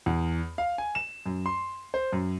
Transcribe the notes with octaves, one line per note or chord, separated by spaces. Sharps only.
E2
F5
G#5
E7
F#2
C6
C5
F#2